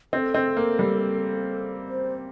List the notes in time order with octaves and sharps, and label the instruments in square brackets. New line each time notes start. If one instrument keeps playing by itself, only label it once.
[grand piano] C4 [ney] A4
[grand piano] C4
A#3
G3
[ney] C5